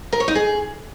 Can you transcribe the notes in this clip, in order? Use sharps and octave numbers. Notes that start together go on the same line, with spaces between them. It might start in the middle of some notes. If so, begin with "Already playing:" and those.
A#4
C#5
D#4
G#4